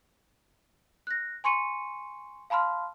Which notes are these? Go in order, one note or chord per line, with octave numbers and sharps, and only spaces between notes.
F#6 A#6
G#5 C6 C#6 C#7 D#7
F5 A5 B5 C6 F6